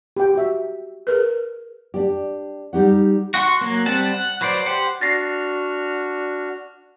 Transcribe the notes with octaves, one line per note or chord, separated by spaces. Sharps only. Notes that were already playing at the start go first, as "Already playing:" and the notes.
G4 G5
F#4 E5
G#4 A#4 B4
D4 G4
G3 D#4 G4 F#5
F#4 F#5 C6 C#6
F#3 A#3
G3 C4 F#5 A5
F#5
F#3 B4 C5 D5
G4 C5 F#5
D4 F#4 F6 A6 A#6 C7